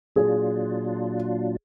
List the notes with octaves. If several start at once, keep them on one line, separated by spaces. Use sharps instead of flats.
A#2 F#3 D4 F4 G#4